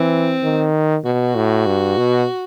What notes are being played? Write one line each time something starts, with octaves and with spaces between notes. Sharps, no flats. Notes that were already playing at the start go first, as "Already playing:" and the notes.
Already playing: E3 C4
D#3
B2 F#4
A2
G2
B2